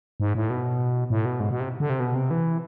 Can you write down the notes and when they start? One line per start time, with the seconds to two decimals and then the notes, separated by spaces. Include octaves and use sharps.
0.20 G#2
0.35 A2
0.50 B2
1.10 A2
1.25 B2
1.40 G#2
1.51 B2
1.60 C3
1.80 D3
1.90 C3
2.00 B2
2.15 C3
2.31 E3